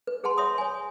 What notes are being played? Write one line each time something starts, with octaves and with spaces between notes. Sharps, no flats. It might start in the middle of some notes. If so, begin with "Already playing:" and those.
B4
G#4 B4 F#5 A5 C6
C#5 E5 C6 D#6
C#5 G#5